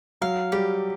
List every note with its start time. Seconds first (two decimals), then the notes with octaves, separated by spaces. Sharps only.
0.21 F#3 F5
0.52 G3 G4